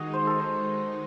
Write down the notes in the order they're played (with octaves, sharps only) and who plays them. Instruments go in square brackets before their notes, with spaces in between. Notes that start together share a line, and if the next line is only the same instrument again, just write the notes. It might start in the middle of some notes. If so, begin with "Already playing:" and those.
Already playing: [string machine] D#3 G#3 D#4 [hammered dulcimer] F#4 G#4
[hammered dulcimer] C5
A4
C5